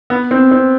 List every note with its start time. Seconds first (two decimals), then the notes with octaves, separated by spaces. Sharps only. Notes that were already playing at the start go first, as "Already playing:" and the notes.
0.10 B3
0.31 C4
0.51 C4